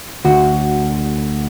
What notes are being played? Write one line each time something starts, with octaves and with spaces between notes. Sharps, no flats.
D2 F#4